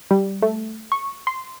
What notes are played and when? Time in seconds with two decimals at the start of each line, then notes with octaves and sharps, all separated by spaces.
0.11 G3
0.42 A3
0.92 C#6
1.27 C6